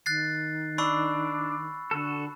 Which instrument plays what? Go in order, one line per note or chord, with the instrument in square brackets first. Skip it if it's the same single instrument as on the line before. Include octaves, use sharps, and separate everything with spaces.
[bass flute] D#3 [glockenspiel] F#6 A6 C7
[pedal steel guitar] D4 [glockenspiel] B5 C#6 E6
[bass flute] D3 [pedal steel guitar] F#4 A4